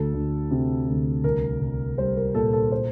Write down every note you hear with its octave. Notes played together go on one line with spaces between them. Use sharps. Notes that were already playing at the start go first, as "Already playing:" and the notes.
Already playing: D2 A4
D2
C3
D2
C2 A#4
C2
G3 C5
A#4
A#2 A4
A4
C5